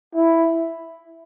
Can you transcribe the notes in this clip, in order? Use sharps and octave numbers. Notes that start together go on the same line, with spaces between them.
E4